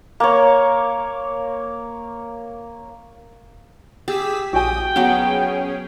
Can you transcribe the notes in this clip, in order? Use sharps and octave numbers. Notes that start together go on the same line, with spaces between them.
A#3 C#5
G4 G#4 E6 B6
A#1 F#4 G5 G#5 D#6
F#3 B3 C#4 G#4